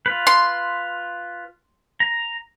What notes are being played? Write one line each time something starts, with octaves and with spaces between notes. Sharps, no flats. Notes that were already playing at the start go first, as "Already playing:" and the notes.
F4 B4
C6
A#5